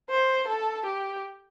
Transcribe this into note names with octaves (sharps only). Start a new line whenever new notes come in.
C5
A4
G4